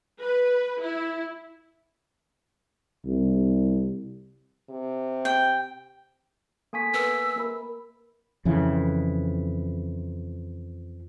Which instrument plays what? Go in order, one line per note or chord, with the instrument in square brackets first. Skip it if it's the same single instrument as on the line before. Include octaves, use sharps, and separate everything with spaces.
[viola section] B4
E4
[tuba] C2
[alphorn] C3
[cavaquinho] G5
[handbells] A#3 G#5 B6 [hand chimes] A4 C#6
[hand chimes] B3 A#4 B4 [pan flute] E6
[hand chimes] A#3 A#4 B5
[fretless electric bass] F2 C#3 E3